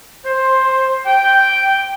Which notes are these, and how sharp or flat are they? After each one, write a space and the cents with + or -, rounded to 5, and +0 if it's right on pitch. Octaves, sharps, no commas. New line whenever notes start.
C5 +10
G5 -5